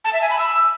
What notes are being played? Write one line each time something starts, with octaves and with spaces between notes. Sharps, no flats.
A5
E5
G#5
B5
E6